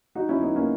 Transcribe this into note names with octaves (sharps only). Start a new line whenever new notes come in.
D#4 F#4
C#4 E4
B3 D#4
A#3 C#4